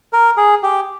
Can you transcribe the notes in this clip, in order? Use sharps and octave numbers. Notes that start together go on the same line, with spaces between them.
A#4
G#4
G4